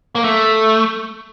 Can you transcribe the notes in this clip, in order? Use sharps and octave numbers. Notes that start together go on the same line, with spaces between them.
A#3
A3